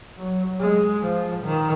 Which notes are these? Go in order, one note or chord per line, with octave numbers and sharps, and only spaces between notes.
F#3
G#3
F3
D#3